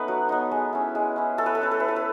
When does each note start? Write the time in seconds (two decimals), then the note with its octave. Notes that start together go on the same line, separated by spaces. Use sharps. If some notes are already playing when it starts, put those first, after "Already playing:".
Already playing: A3 B3 C#4 D#4 B4 F#5
0.08 F#3
0.29 B3 D#4
0.51 G#3
0.73 C#4 E4
0.95 G#3
1.16 C#4 E4
1.38 A3 A4
1.46 B4
1.55 A4
1.60 C#4 E4 B4
1.71 A4
1.80 A3 B4
1.88 A4
1.96 B4